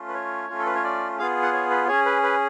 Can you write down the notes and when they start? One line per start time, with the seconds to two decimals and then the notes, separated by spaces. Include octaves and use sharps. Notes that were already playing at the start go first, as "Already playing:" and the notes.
Already playing: A3 C#4 F4
0.08 B4
0.14 C#5
0.49 A3 C#4 F4
0.59 A4
0.66 B4
0.75 C#5
0.84 D5
1.19 B3 F4 G#4 F5
1.42 F#5
1.53 C#5
1.71 B4
1.88 C#4 G#4 C#5
2.06 B4
2.23 B4